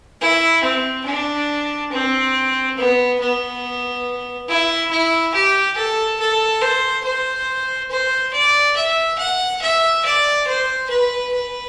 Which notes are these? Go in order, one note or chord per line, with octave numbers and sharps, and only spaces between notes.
E4
C4
D4
C4
B3
B3
E4
E4
G4
A4
A4
C5
C5
C5
D5
E5
F#5
E5
D5
C5
B4
B4